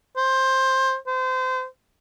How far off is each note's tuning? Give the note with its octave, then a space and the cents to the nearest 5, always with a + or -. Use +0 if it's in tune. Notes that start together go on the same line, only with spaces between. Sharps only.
C5 +15
C5 -30